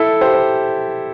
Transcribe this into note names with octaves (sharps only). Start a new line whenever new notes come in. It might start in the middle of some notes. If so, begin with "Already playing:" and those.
Already playing: E4 A4
G4 C5